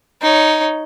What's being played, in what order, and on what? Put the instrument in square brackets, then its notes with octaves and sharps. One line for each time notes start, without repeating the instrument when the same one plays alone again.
[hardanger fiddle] D#4 C#5